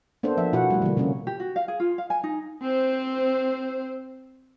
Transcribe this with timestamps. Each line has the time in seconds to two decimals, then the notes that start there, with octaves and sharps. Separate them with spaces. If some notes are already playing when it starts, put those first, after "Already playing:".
0.23 A#3 B3 D4 A4 C5
0.37 F3 E5
0.53 B2 E4 F#4 F#5
0.70 G3 A3
0.82 D3 E3 A#3
0.97 C3 A#3 C#4
1.27 G4
1.40 F#4
1.56 F5
1.68 G#4
1.80 F4
1.98 F5
2.10 G#5
2.24 D#4
2.62 C4 C5